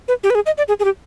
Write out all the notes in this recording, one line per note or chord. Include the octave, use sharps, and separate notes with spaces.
B4
G4
B4
G#4
D#5
D5
G#4
G#4
G4